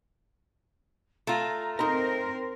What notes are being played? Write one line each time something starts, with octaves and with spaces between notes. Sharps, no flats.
A3 F4 A#5
C4 D#4 A#4 E5 A#5 C6